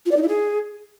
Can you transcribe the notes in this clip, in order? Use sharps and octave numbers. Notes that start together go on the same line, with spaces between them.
F4
D5
D#4
E4
G#4